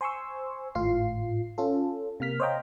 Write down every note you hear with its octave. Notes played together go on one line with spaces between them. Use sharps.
C5 G#5 C6 C#6 E6
G#1 A2 F4 C7
C#4 F4 A4
C3 A#3 F6 B6
C5 C#5 D#5 F5 G5 A#5